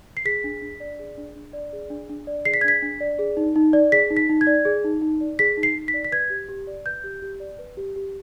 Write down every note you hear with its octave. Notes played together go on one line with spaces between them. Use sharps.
C7
G#4 B6
D4
D4
D5
G#4
D4
D4
D5
G#4
D4
D4
D5
G#4 C7
B6
G#6
D4 B6
D4
D5
G#4
D#4
D#4
D5
G#4 B6
D#4
B6
D#4
G#6
D5
G#4
D#4
D#4
D5
G#4 B6
D#4
C7
D#4
B6
D5
B6
B4 G#6
G4
G4
D5
B4 G6
G4
G4
D5
B4
G4
G4